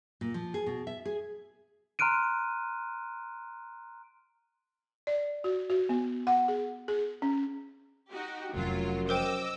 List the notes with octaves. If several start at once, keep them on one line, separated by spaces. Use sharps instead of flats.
A#2
F3
G#4
B2
E5
G#4
A#5 C6 F6 F#6 D7 D#7
D5
F#4
F#4
B3
F#5
G#4
G#4
C#4
D#4 F#4 G4
F1 F#2 F3 F#3 F4
A#4 C5 D#5 G5 D6 E6